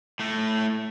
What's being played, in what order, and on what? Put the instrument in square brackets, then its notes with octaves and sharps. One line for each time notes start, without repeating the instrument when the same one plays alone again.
[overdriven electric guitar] A2 A3